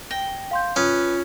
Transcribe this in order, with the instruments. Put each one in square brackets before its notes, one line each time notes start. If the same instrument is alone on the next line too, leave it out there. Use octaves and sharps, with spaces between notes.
[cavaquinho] G5 [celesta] A#6
[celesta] F5 C6 G6
[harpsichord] C#4 [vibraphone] F4 [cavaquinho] B4 [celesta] D#6